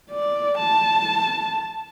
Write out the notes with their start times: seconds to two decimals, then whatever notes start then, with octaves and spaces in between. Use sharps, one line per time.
0.11 D5
0.58 A5